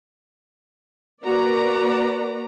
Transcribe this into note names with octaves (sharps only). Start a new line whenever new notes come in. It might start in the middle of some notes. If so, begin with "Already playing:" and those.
A#3 F#4 B4 D5 A#5